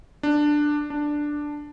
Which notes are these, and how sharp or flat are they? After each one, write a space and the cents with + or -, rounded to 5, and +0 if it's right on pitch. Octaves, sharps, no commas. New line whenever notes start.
D4 +10
D4 +5